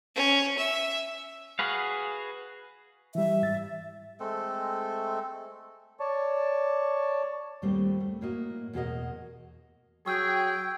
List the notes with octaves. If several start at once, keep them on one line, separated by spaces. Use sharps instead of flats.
C#4
E5
F#4 G#4 B4 F5
E3 G3 E5
G#2 A6
G#3 A3 C4 A4
C#5 D5 A5 C#6
D#2 A#2 G3 A3 C4
A3
A2 A#3 F#4 D#5
E2 B2 F#4 G4 A#4 D#5
F#3 G#4 G5 C#6 E6 G6